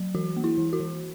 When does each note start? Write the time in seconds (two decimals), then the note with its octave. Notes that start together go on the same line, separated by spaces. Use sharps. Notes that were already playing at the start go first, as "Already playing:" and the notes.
Already playing: F#3
0.15 E3 F#4
0.37 A#3
0.44 E4
0.58 E3
0.73 F#4
0.80 E3